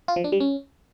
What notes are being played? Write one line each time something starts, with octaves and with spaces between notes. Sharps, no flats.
F4
F3
D4
G3
C#4